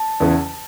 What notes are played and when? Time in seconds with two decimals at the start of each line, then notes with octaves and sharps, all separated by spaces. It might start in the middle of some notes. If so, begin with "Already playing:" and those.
Already playing: A5
0.20 E2 C#3 E3